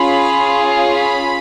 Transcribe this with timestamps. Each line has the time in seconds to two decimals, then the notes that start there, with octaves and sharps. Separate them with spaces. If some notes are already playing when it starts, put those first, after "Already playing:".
Already playing: C#4 F4 G#4 B5
0.91 B5